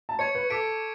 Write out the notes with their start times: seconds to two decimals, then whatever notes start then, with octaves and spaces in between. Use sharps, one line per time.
0.09 A5
0.19 C#5 C#6 G#6 C#7
0.35 B4
0.50 A4 D6 G#6 B6 D7